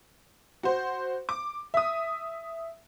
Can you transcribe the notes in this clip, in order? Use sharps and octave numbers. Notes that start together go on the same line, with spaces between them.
F#4 C5
D6
E5 D#6